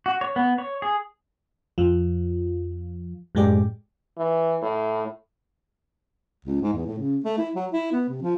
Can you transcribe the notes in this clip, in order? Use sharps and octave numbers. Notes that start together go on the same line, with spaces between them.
F#4
C#5
B3
C#5
G#4
F2 F3
F#2 A2 G#3 G4 D5
E3
A2
C#2
G#2
E2
A2
C#3
A3
E4
F#3
E4
B3
C3
F3